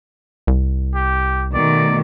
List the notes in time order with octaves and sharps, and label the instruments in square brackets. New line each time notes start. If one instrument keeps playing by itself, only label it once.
[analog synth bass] C2
[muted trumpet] G4
[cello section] B2 D#3 A3 [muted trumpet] D5